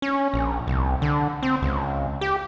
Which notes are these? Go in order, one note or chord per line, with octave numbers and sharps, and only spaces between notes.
C#4
A#1
C2
D3
C4
C#2
G4